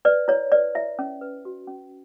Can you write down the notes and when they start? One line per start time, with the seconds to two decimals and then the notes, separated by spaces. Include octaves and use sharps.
0.05 B4 D5
0.28 E4 C#5
0.52 B4 D5
0.75 E4 E5
0.99 C#4
1.21 B4
1.45 F#4
1.67 C#4